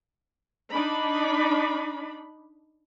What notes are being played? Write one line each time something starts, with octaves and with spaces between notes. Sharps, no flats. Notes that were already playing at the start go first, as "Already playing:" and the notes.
D4 D#4 B5